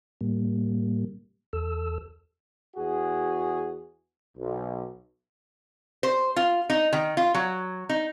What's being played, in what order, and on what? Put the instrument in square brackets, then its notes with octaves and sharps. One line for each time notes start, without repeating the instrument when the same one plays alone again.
[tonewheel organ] A2 G3 A#3
E2 A4 E6
[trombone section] E2 F#4 G#4
B1
[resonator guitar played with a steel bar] C5
F4
D#4
D#3
F4
F#3
D#4